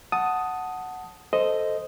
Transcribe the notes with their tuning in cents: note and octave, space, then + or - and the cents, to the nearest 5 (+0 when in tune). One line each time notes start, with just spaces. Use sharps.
F#5 +0 A5 +0 D#6 +0
A4 +0 C5 -5 D#5 +0